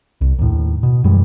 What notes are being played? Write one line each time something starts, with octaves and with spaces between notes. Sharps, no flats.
C2
D#2 A2
B2
F#2 E3 G3 G#3